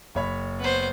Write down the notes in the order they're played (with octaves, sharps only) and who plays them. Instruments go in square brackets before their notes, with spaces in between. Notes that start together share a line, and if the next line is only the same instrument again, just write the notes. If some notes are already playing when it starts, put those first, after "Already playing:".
[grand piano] F#1 C#5 B5
[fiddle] B3 C5